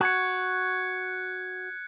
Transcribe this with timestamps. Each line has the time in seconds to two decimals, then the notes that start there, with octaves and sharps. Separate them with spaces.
0.01 F#4 F#6 G#6 C#7